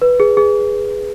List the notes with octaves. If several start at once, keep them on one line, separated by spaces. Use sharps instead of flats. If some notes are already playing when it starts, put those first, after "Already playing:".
B4
G#4
G#4